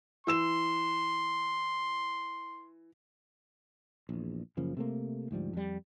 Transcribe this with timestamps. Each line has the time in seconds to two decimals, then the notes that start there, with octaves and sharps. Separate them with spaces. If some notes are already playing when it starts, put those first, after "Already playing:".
0.27 E3 C6 E6 E7
4.09 A#1 E2
4.57 F#2 C#3 F3 A#3
4.77 C3 A3 A#3
5.31 D2 G#2 F3 G3
5.53 F2 G3